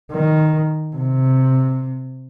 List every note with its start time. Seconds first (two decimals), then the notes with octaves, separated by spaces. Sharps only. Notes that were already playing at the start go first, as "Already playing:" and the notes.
0.12 D#3
0.96 C3